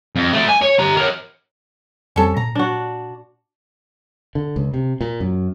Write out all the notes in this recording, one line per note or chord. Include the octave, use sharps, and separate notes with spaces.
F2
A3 D5
G#5
C#5
G4 A#5
A#4 C#5
F2 G3 C4 C#4 A4
A#2 A#5
D4 F#4
D3
C#2
C3
A#2
F#2